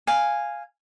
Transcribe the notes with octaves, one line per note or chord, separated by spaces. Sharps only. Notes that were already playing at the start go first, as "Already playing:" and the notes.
F5 G#5